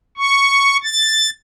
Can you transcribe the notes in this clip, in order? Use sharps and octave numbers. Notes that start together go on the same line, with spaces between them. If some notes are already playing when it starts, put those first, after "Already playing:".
C#6
A6